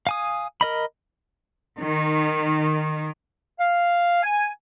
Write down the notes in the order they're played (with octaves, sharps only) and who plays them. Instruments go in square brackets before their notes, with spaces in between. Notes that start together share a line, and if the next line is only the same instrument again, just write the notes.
[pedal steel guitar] F5 G#5 D#6
A#4 D#5 B5
[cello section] D#3
[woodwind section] F5
G#5